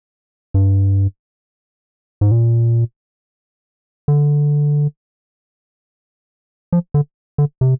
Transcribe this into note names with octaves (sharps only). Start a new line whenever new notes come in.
G2
G#2
A#2
D3
F3
D3
D3
C3